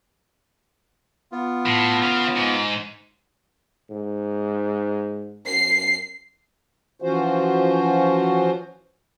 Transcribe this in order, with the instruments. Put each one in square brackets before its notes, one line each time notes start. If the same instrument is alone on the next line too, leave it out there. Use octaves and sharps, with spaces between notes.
[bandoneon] B3 F4
[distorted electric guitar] A2
C#4 F5
G#2
[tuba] G#2
[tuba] F#2 [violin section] C7
[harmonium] E3 F3 C#4 F4 F#4 C5